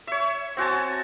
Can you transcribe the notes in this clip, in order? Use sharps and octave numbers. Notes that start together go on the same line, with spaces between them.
C#5 E5
C4 F#4 G#5 A5